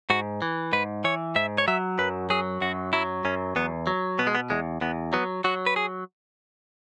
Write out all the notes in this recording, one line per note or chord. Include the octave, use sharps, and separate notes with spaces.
G#2 F#4
E3
G#2 B4
E3 C#5
G#2 E5
C#5
F#3 E5
F#2 B4
F#3 G#4
F#2 F#4
F#3 E4
F#2 C#4
E2 B3
F#3
B2 B3
G#3
B3
E2 G#3
E2 B3
F#3 B3
F#3 F#4
B4
G#4